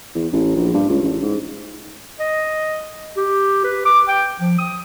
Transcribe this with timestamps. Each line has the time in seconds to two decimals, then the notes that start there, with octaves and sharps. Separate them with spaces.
0.15 E2
0.33 A1
0.56 A#1
0.74 G2
0.90 C#2
1.02 A1
1.22 G#2
2.20 D#5
3.17 G4
3.64 B4
3.85 D6
4.08 G5
4.39 F3
4.58 D#6